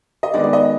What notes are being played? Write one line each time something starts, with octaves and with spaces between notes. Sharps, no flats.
D#5
D#3 G#3 B3 D5
D5
D#5